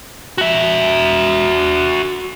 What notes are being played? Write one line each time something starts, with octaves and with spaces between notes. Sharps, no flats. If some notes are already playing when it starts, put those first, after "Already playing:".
F#4 E5